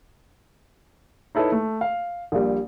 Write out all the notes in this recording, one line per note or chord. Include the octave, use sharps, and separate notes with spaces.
D#4 E4 A4 B4 C#5
A3
F5
A#1 A#2 G3